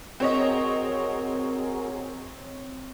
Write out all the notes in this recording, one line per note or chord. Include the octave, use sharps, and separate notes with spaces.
C4 F#4 G#4 A#4 C#5 D#5